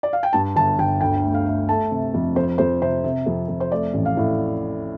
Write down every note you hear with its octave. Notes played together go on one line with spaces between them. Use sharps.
D5
F5
G5
G2 A5
G1 A5
G1 G5
D2 G5
A3
F5
A3
A3 A5
C3
F2
F2 C5
F2 C5
C3 C5
C3
F2
F2
C5
A3 D5
A1
F5
A2